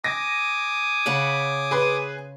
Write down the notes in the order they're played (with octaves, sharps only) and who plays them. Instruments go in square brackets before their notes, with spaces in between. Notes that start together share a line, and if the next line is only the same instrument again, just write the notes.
[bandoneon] G#5 D6 D#6 [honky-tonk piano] A#6
[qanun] C#3 F#5 B5
[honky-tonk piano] G#4 B4 C6